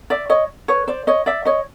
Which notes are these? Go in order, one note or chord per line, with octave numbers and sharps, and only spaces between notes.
D5 E5
C#5 D#5
B4 C#5
C5 D5
C#5 D#5
D5 E5
C#5 D#5